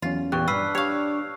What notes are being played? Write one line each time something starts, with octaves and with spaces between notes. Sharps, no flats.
E2 F#3 C#4 F4
E2 A#2 G4 G5 C#6 F#6
G2 D4 B4 E6 F6 C7
G4 C#5 F5 C#6